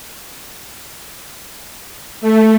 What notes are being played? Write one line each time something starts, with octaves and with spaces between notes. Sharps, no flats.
A3